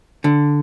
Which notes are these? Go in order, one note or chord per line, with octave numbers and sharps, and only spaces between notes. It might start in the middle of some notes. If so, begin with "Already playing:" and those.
D3